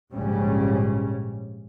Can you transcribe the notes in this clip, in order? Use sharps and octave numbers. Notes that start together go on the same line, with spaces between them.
A#1 G#2 C#3 G3 C#4